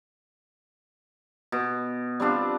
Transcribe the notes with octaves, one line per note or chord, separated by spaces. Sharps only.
B2
G3 C4 D4 F4